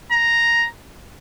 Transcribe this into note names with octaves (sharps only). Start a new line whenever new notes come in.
A#5